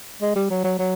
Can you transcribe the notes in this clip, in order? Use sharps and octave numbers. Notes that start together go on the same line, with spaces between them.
G#3
G3
F#3
F#3
F#3